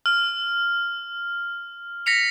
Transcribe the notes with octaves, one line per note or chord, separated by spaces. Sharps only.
F6
A#6 B6 C#7 F7